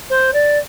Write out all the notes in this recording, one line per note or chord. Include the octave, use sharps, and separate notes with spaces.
C5
D5